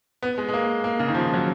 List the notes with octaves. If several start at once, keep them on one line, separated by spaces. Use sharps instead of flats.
B3
G#3
G#3
A#3
A#3
C#3
D#3
F3
F#3